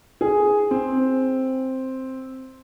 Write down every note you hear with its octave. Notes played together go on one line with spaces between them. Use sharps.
G#4
C4